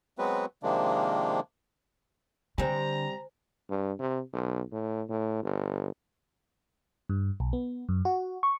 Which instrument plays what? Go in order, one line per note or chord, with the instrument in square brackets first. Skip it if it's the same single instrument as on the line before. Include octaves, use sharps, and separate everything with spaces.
[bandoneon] F#3 G#3 B3 C4 F#4 B4
C3 D#3 F3 G#3 A#3 D4
[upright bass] D3 [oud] G3 C4 [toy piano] C5 G#5 [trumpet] A#5
[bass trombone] G2
C3
B1
A2
A2
G1
[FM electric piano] G2
B1
B3
F#2
F#4
C#6